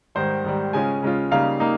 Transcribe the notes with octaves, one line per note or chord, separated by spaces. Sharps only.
G#2 D#3 G3 C5
G#2 D#3 G3
C#3 G#3 C#4 F4 G#5
C#3 G#3 C#4 F4
C#3 G3 A#3 D#4 F5
A#3 D#4